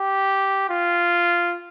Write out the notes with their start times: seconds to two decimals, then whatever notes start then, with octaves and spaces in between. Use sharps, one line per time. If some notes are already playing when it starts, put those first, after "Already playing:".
Already playing: G4
0.70 F4